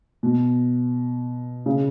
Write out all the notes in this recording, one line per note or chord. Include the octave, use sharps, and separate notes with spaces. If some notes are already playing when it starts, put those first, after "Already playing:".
B2
C#3